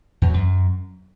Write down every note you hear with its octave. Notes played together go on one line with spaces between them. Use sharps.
E2
F#3
F#2